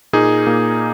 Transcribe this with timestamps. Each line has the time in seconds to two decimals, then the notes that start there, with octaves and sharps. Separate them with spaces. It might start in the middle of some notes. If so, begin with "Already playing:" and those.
0.13 A#2 A#3 D#4 G#4
0.47 A#2 A#3